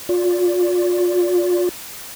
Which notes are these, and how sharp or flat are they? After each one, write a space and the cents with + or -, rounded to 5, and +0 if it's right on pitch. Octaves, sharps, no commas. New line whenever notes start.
F4 +30 D5 -20